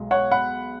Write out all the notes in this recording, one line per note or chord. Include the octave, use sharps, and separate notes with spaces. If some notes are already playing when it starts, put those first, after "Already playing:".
Already playing: B1 B2 G#3
C#5 F#5
F#5 B5